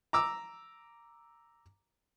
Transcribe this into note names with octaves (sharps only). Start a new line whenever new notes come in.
A#5 D6 E6